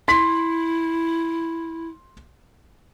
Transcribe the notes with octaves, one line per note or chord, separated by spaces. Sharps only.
E4 C6 B6